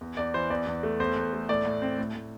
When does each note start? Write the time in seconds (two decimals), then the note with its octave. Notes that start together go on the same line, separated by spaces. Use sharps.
0.01 E2
0.17 E2 D5
0.34 E3 C5
0.50 E2 D5
0.67 E2
0.83 A3
1.00 E2 C5
1.16 E2
1.33 A3
1.49 A2 D5
1.65 A2
1.82 C4
1.98 A2
2.15 A2